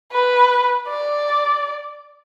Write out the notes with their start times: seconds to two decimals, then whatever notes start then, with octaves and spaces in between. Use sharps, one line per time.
0.12 B4
0.88 D5